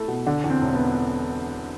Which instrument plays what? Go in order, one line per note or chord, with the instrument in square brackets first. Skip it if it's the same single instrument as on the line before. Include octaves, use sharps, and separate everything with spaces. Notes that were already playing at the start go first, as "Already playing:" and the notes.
Already playing: [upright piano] A3 A4 [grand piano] E4
[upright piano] B2
[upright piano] D3 [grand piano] D4
[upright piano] E2
[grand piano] C4
[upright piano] E1
[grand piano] B3